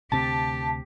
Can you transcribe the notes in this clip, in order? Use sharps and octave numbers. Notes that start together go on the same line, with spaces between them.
D2 C3 C4 G4 A5